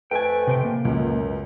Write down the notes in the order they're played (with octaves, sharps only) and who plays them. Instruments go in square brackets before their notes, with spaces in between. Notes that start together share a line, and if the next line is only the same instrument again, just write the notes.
[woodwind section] F2 A3 B4 [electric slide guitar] G5 G#5
[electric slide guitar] C3 C5 G5
A#3
[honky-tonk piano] C#2 [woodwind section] F#2